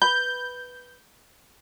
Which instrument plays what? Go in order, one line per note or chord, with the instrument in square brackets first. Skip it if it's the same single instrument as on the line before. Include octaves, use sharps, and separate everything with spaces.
[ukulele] B4 B5 [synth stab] G6